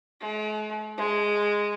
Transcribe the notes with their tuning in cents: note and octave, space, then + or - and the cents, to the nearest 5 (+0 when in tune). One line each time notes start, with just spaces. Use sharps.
G#3 +45
G#3 -5